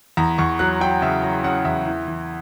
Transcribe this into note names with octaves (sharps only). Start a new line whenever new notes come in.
E2 A#5
E2 C#6
F#3 F#6
F#3 G5
C#3 E5
F#3 A#5
C#3 F#5
E2 E5
E3
E3